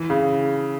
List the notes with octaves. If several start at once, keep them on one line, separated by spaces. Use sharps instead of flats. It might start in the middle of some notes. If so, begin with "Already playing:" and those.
Already playing: E3
C#3